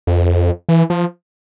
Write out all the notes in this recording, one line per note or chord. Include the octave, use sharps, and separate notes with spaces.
F2
E3
F3